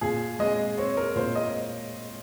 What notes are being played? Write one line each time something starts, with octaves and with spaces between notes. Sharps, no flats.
A#2 G#4
G#3 D#5
C4 C#5
A#4
A#2 C5
D#5